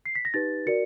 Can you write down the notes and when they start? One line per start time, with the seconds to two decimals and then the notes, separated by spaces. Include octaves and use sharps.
0.06 C7
0.15 B6
0.25 A#6
0.34 D#4 G4 B4 A6
0.66 F#4 A#4 D5 C#7